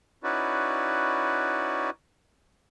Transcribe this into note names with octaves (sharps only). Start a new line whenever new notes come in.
C#4 D#4 E4 F#4 B4 D5